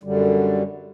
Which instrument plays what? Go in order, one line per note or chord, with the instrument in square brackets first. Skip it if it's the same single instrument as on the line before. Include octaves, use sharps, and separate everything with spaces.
[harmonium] F#2 D3 G3